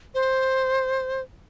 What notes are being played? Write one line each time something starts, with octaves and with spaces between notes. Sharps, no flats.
C5